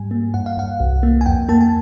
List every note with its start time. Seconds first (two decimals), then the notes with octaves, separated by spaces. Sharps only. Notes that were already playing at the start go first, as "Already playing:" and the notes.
Already playing: G#2 G3 G#5
0.11 A#3
0.34 G2 F#5
0.46 F5
0.57 G2 F#5
0.80 C2
1.03 A#3
1.21 G#5
1.26 F2 G5
1.49 A#3 A5
1.61 G#5